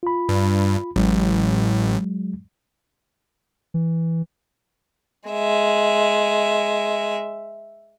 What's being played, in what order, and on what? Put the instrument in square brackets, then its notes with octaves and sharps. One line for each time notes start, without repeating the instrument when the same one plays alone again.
[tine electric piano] F4 B5
[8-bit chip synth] G2
[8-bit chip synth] A1 [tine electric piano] F#3 G#3
[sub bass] E3
[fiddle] G#3 E5